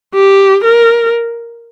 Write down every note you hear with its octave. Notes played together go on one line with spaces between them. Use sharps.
G4
A#4